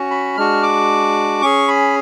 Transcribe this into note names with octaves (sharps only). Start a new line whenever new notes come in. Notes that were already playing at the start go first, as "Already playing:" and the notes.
Already playing: C#4 F#4
B5
G#3 D4 F#4 F6
D6
C#4 G#4 C#6
B5